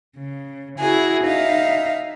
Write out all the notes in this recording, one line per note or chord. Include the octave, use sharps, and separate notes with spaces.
C#3
E4 F#4 G#4 G#5
D#4 E5 F5